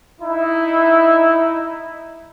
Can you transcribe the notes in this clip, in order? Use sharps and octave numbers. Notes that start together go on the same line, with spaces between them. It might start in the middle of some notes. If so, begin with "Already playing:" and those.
D#4 E4